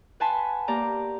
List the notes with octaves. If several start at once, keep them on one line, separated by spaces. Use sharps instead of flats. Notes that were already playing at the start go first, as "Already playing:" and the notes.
B4 F#5 G#5 A5 B5 C6
A#3 G4 D5 A#5